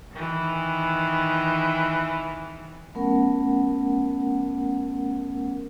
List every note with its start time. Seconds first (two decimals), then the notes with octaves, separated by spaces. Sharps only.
0.13 D#3 E3
2.95 F#3 A3 B3 C#4 A#4 F#5